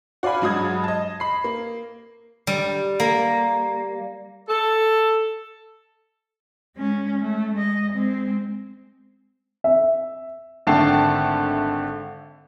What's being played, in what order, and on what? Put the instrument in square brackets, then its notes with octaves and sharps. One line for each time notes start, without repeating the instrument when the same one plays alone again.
[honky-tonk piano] F#4 D5 F5 G#5 B5
G2 F#3 G#3 D#6 G#6
D#5 A5
B5 C7
A#3
[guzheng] G3
A#3
[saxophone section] A4
[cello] G#3 C#4
A3
G#3 D#5
G#3 C4
[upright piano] E5
[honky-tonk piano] G#1 D3 A3 G5 A5 C7